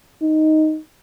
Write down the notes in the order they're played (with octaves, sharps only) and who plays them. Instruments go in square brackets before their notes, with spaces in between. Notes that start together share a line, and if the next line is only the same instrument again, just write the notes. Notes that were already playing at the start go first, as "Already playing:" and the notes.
[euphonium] D#4